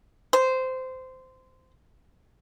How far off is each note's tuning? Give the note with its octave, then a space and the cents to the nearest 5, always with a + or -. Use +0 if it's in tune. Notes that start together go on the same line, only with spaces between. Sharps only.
C5 -15